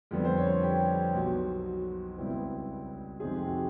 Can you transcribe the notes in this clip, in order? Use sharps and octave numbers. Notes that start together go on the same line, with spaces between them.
F2 D3 G3 B3
C5
C#5
G4
B1 B2 F#3 F#4
F#4
C#2 B2 G3 C4 E4
F2 C3 D#3 G#3 C4 G#4
G4
F#4